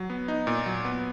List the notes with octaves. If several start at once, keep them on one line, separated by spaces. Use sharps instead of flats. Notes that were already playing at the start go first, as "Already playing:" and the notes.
Already playing: F#3
B3
D#4
A#2
F#3
B3